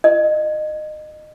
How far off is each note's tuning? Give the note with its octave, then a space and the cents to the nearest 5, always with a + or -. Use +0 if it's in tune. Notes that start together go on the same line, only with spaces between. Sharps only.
D#5 -25